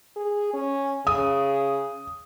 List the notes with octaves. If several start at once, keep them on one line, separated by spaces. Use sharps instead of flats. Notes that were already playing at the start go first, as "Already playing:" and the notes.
G#4
C#4
C#3 D#6